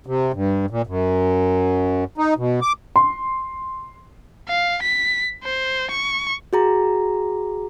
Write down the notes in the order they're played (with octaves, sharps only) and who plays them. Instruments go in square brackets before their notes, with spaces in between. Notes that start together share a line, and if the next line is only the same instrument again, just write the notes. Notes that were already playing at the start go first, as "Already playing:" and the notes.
[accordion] C3
G2
A#2
F#2
D#4
B2
D6
[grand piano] C6
[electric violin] F5
B6
C5
C#6
[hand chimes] F#4 G#4 A#5